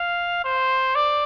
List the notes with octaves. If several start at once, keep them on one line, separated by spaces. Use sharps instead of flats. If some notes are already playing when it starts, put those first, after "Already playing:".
Already playing: F5
C5
D5